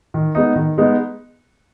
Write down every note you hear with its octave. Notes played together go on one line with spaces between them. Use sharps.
D#3
G#3 B3 D#4
D#3
G#3 B3 D#4